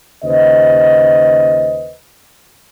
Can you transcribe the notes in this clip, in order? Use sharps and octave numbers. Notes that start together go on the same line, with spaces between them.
D#2 C#3 B4 C5 D#5